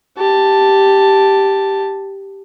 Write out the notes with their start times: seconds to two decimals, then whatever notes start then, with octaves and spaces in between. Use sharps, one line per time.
0.17 G4 A5